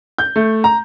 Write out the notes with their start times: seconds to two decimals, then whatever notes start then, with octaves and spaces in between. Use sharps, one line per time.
0.18 G6
0.36 A3
0.64 A#5